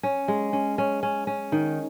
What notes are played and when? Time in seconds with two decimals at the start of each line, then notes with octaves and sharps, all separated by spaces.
0.03 C#4
0.28 G#3
0.53 C#4
0.78 C#4
1.03 C#4
1.27 C#4
1.52 D#3